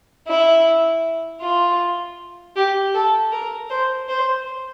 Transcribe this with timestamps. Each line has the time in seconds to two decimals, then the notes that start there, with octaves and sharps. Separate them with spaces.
0.28 E4
1.41 F4
2.56 G4
2.94 A4
3.32 A#4
3.70 C5
4.09 C5